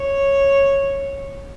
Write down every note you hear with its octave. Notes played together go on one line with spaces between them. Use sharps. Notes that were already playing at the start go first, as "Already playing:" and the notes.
Already playing: C#5